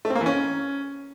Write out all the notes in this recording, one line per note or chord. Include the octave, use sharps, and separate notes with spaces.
A3
C4
A#3
E3
C#4